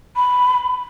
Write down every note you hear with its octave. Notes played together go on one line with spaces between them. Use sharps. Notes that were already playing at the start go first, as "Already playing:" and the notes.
B5